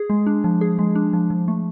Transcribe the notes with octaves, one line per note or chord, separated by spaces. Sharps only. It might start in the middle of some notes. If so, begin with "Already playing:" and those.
Already playing: G#4
G#3
D4
F3
G#4
G#3
D4
F3
F3
A3